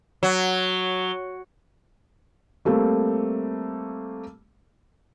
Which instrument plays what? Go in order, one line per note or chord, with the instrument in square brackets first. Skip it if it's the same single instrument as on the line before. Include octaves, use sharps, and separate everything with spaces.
[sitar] F#3
[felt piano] G3 A3 A#3 C4